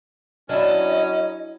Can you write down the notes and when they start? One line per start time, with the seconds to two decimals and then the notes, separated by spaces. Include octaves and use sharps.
0.49 F#3 C#4 D4 E4 D#5